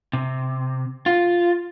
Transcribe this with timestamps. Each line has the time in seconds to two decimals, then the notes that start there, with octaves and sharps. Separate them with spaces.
0.13 C3
1.06 F4